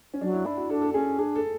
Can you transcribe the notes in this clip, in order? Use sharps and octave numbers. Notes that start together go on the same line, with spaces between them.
C#4
F#3 D4
E4
D4 E4
F#4
D4 A4
A4
C#4 G#4
D4 G#4
A4